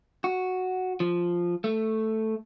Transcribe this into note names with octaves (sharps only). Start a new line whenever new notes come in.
F#4
F3
A3